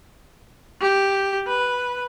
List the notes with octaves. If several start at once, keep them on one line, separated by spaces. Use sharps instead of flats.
G4
B4